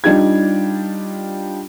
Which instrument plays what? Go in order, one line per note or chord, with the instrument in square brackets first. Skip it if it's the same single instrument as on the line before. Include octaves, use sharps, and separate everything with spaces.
[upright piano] G3 D4 D#4 F4 G4 G#6